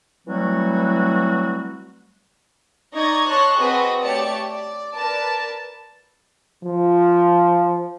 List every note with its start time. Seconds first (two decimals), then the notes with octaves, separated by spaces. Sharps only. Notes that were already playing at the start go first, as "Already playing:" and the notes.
0.28 E3 F#3 G3 A3 C4 F#4
2.94 D#4 D5 D#5 C#6 G#6
3.27 C#5 D#5 A5 C6 C#6 F#6
3.59 C4 F#4 G#4 B4 D#5
4.02 A3 G4 C#5 D5 A5 C#7
4.47 D5
4.95 A#4 B4 D5 A5
6.64 F3